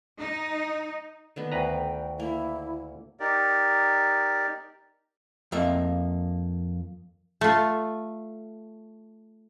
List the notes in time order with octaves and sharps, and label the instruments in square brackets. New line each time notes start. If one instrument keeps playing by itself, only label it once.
[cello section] D#4
[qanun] D3 D#3 B3
[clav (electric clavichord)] D2 B4 A#5 [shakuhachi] G5
[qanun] A#3 [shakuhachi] E4
[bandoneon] D#4 G4 A#4 D5
[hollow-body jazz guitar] F2 A#3 E5
[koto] A3 F4